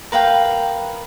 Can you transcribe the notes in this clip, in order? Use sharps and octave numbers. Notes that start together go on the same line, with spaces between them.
A#4 B4 F5 G5